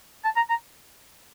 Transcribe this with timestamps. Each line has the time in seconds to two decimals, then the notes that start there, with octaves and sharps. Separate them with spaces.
0.25 A5
0.37 A#5
0.50 A#5